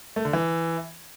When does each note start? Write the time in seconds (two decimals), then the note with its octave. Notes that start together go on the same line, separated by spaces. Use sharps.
0.16 A3
0.25 D3
0.33 E3